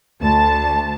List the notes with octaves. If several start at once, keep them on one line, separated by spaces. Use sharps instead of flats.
D2 A5